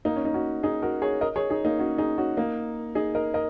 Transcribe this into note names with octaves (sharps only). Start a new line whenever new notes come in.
A#3 D#4
C#4
D#4
C#4 F#4
D#4 G#4
F#4 A#4
G#4 C#5
A#4 D#5
G#4 C#5
D#4 G#4
A#3 D#4
C#4 F#4
D#4 G#4
C#4 F#4
A#3 D#4
D#4 G#4
A#4 D#5
A#4 D#5